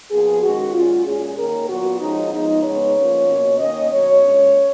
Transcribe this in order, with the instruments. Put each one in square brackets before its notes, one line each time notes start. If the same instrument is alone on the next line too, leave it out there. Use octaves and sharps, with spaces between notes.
[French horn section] A#2 F3 B3 G#4
D#3 G#3 C#4 F#4
A#2 G#3 C#4 F4
A#2 G#3 C#4 G#4
D#3 A#3 C#4 A#4
A#2 F#3 B3 F#4
F3 G#3 C#4 D#4
F3 G#3 B3 D#4
C#3 G#3 B3 C#5
F3 A#3 C#4
B2 A#3 C#4
D#3 A#3 C#4 D#5
B2 F#3 C#4 C#5
A#2 G#3 C#4